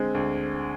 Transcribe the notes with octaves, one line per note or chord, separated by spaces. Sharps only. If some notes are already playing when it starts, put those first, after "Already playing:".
Already playing: D3 G#3 C4
D2